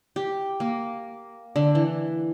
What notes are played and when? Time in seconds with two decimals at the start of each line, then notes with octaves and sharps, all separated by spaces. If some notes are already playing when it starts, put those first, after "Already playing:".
0.16 G4
0.60 A#3
1.56 D3
1.75 E3